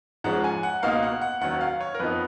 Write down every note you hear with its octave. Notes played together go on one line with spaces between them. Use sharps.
G#2 F3 G#3 C#4 F#5
G#5
F#5
C#2 B2 A#3 D#4 F5
F#5
F#5
D#2 D#3 F#3 C#4 F#5
F5
C#5
A#4
F2 F3 B3 D#4 B4